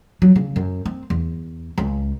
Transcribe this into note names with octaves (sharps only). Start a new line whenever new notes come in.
F#3
C#3
F#2
C4
E2
C#2